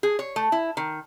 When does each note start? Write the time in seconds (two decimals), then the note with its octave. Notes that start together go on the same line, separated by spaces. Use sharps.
0.03 G#4
0.19 C#5
0.36 A3
0.52 E4
0.77 D#3